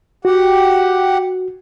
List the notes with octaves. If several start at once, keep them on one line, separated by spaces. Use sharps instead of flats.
F#4 G4 F#5